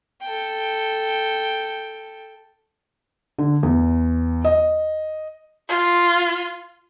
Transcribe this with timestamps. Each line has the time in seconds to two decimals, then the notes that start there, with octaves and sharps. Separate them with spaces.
0.22 A4 G5
3.38 D3
3.63 E2
4.45 D#5
5.69 F4